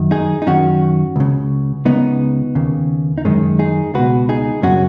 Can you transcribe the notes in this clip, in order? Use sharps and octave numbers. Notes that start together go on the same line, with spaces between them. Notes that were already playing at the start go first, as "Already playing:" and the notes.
Already playing: F#2 D#3
D#4 G#4
D#4
F#2 D#3 C#4 F#4
C#2 C#3
C#2 C#3 B3 D#4
D#2 C#3
D#4
F#2 D#3 G#3 C#4
D#4 G#4
C#2 B2 F#4 B4
D#4 G#4
F#2 C#3 C#4 F#4